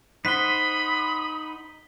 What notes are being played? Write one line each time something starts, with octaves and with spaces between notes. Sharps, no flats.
D#4 C5 F#5 B5 D#6 B6 G7